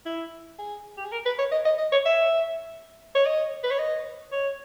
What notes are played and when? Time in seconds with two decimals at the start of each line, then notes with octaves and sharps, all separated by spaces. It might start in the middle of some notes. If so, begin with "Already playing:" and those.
0.06 E4
0.59 G#4
0.97 G4
1.05 G#4
1.12 A#4
1.26 B4
1.39 C#5
1.52 D#5
1.65 D#5
1.78 D#5
1.92 C#5
2.06 E5
3.15 C#5
3.25 D#5
3.63 B4
3.71 C#5
3.79 D#5
4.32 C#5